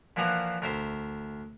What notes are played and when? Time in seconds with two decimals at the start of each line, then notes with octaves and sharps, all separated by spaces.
0.16 A#2 E3 F3 F#5 A#5
0.62 D2 A#4 C5 E5